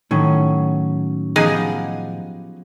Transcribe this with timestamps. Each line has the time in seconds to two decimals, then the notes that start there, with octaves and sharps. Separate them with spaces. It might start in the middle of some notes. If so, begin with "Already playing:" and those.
0.11 A2 D#3 F#3 C#4
1.36 F3 B3 D#4 G4 G#4 G#5